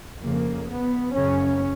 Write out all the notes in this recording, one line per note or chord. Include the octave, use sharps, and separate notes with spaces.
F2 C#3 A#3
B3
F#2 C#3 C#4